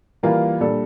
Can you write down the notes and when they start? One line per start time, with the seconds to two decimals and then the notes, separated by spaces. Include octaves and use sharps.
0.23 E3 G3 A#3 F4 A#4
0.61 A#2 G3 D4 A4